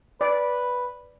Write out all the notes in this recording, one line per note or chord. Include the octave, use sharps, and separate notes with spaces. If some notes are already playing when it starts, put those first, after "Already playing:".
B4 D5